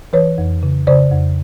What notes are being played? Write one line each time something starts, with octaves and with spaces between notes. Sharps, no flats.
E3 B4 C#5
F2
C#3
C#3 C5 D5
F2